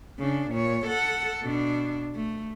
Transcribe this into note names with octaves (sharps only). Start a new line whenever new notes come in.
C#3 D4
A#2 C#5
A4 F#5
B2 D4
A3